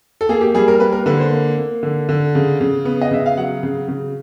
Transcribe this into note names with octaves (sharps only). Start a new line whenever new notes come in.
A4
A#3 G#4
G4
G3 G#4
A#4
A#3 B4
A#4
D3 B4
C5
A#3
A#3
D3
D3
C#3
C#3
B3
D#5
C#3 E5
F5
F#3 F#5
C#3
C#3